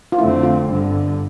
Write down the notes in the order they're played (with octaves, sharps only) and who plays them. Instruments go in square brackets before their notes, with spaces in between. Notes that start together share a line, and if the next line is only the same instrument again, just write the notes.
[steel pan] F4
[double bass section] F2 D3 A3 C4 [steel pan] E4
[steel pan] F4
[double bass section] G1 G2 D3